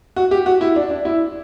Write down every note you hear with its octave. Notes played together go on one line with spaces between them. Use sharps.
F#4
G4
F#4
E4
D4
D4
E4